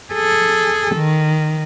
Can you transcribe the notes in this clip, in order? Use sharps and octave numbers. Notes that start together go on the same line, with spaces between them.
G#4 A4
D#3